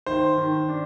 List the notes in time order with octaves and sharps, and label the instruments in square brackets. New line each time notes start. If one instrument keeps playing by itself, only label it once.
[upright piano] D#3 [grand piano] C5
[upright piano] D#3
D4